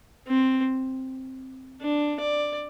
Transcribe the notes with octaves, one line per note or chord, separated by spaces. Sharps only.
C4
D4
D5